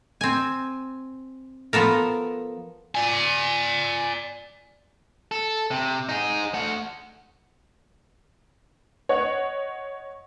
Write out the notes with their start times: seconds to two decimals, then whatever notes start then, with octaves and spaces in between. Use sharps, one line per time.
0.21 C4 G#5
1.73 F3 B3 A4 A#4
2.95 D5 G#5
5.31 A4
5.71 C3
6.09 D#4 G#4
6.54 A3 F#5
9.09 C#5 D#5 F#5